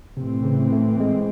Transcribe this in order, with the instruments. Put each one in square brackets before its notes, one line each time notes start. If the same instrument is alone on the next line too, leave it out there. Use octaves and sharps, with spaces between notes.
[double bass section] A2 E3 C4 [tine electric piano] C3
[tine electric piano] C#3
A3
G#3